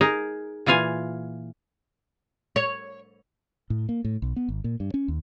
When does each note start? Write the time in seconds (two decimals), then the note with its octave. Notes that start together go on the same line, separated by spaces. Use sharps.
0.01 D#4 G#4 A#4
0.66 A#2 E3 F4 F5 G#5
2.56 C#5
3.70 A2
3.89 A#3
4.04 A2
4.22 B1
4.36 B3
4.48 G#1
4.64 A#2
4.80 G2
4.94 C#4
5.08 D#2